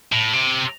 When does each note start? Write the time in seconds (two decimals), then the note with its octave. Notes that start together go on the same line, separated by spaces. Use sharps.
0.12 A2
0.33 C3